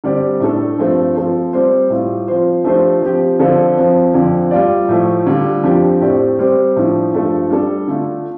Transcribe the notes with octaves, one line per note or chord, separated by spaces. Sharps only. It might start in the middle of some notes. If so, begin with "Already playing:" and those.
D3 G3 C4 G4 D5
A2 A3 D4 A4
G2 F3 A3 C4 A4
F3 C4 A4 C5
G3 C4 G4 C5
A2 G3 F4
F3 C4 F4 C5
F3 A3 D4 G4 C5
F3 C4 G4
D3 F3 C4 F4 A4
F2 F3 C4
F2 D3 F3
G3 F4 D5
A2 F3 A3
D3 G3 F4
F2 F3 D4 G4
A2 A3 C4 G4 D5
G3 C4 G4 C5
A2 F3 D4
G2 F3 A3 D4 A4
G3 D4 A4
D3 A3 F4